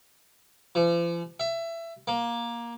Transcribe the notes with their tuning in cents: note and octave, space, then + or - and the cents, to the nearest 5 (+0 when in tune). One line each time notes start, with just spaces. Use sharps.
F3 -45
E5 +20
A#3 +15